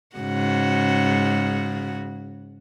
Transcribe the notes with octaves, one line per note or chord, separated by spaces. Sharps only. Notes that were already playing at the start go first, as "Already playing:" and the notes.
G#2 C#3 F#4